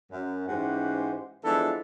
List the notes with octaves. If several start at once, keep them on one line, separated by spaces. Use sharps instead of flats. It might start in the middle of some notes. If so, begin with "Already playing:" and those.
F#2
G#2 E3 C#4 G4 C5 F#5
E3 F3 G#3 B3 D4 A4